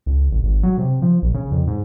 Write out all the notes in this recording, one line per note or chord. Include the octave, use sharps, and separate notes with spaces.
C#2
A1
G#1
F#3
C3
F3
A#1
C#3
F2
G#2